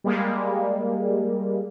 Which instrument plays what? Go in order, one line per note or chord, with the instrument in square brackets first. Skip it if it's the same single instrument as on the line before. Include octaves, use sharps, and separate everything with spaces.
[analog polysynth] G3 G#3 A#3